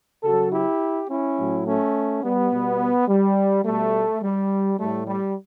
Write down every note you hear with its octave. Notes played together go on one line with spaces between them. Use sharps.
C#3 F#3 F#4 A4
E4 G4
C#4 E4
A2 F#3
A3 C#4
G3 B3
B2 G3
G3
B2 G3 A3
G3
A2 G3 A3
G3